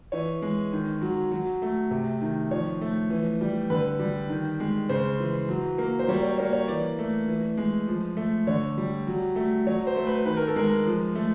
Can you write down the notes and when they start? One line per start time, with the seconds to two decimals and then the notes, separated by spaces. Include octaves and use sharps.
0.12 E3 C#5
0.42 G#3
0.73 D#3
1.02 F#3
1.31 F#3
1.62 A3
1.91 C3
2.22 D#3
2.51 F3 C#5
2.81 A3
3.10 E3
3.41 G3
3.70 D3 B4
3.99 G3
4.30 D#3
4.60 G#3
4.89 C#3 C5
5.20 E3
5.49 F#3
5.78 A#3
5.99 C5
6.08 G3 C#5
6.23 C#5
6.38 A#3 C#5
6.53 C#5
6.68 E3 D5
6.99 A3
7.28 E3
7.57 G#3
7.88 F3
8.17 A3
8.47 D3 C#5
8.78 G3
9.07 F#3
9.36 A3
9.67 F#3 C#5
9.87 C5
9.96 A3
10.07 B4
10.25 D#3 B4
10.37 A#4
10.47 A4
10.56 G#3 A#4
10.85 F3
11.15 A3